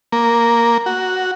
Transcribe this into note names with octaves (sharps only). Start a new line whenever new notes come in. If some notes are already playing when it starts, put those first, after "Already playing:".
A#3
F#4